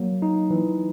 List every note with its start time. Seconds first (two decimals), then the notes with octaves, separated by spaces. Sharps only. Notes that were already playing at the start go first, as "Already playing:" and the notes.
Already playing: F#3 A#3
0.22 D#4
0.50 E3